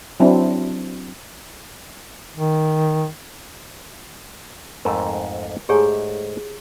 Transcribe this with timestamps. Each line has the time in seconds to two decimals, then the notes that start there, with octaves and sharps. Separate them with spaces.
0.20 F#3 C4 D4 E4
2.37 D#3
4.85 F2 G#2 A3 A#4
5.69 G#2 G#3 A3 G4 G#4 C#5